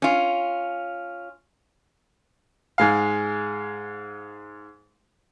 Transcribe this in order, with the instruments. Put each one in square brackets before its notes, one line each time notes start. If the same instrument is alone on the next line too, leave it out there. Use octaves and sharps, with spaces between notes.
[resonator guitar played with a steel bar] C#4 F4
[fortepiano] G#2 G#3 F5